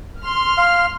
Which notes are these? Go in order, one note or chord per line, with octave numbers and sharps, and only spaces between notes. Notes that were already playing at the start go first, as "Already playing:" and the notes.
C6 F6
F5